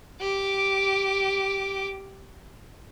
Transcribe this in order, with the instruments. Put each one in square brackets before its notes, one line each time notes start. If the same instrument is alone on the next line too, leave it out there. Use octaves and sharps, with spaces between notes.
[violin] G4 D6